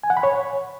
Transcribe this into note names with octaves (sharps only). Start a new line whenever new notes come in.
G#5
F#5
B5
C#5